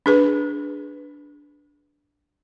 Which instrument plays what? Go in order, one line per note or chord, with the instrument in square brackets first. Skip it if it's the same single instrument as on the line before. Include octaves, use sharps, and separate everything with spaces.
[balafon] D4 G#4 B4